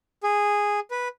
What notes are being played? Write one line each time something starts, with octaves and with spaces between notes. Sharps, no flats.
G#4
B4